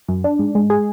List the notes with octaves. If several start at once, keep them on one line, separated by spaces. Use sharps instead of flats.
F#2
D4
G#2
G#3
G#4